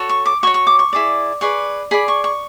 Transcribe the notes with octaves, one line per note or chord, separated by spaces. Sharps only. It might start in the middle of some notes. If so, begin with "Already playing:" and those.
Already playing: F#4 A4 C#5
C#6
D6
F#4 C#5 C#6
C#6
D6
C#6
E4 G#4 D5
G#4 B4 D5 C#6
G#4 D5 B5
C#6
C#6